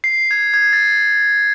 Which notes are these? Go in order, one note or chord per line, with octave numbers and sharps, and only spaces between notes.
C7
G#6
G#6
A6